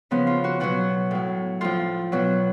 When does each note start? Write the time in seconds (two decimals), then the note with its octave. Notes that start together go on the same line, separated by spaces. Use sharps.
0.11 C#3 F3 B3
0.27 F4
0.44 F#4
0.60 B2 F#3 F#4
1.11 A2 F#3
1.61 A2 F3 F4
2.12 B2 F#3